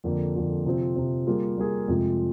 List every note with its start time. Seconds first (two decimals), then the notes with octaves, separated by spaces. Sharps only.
0.04 F2 D3 F3 A#3
0.35 F2 D3 F3 A#3
0.65 C3 F3 C4
0.96 C3 F3 C4
1.27 G3 A#3 F4 G#4
1.57 G3 A#3 F4 G#4
1.88 F2 C3 F3 G#3